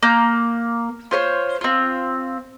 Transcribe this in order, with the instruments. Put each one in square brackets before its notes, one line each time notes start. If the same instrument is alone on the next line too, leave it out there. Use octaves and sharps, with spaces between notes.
[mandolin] A#3 G6
F4 C5 C#5
C4 F4